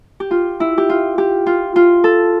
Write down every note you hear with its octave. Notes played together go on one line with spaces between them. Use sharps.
G4
F4
E4
G4
F4
G4
F4
F4
A4